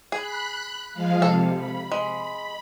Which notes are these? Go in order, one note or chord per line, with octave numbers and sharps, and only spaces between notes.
G#4 B5 F#6
F3 G#3 F5
C3 A4
B5
G#3